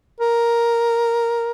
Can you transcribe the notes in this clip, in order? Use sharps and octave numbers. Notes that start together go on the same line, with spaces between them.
A#4